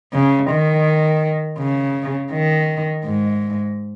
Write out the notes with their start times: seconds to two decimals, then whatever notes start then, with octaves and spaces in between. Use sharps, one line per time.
0.14 C#3
0.51 D#3
1.59 C#3
2.32 D#3
3.05 G#2